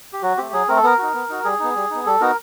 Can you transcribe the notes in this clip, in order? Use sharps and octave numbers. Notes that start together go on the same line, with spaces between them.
G4
F#3 F#4
A3 C4 G4
F#3 G#4
A3 C4 A#4
A4
B3 A#4
D#4 F#4
B3
D#4 F#4
G3 G#4
B3 D#4
G3
B3 D#4
G3 A4
B3 D#4 F#4 A#4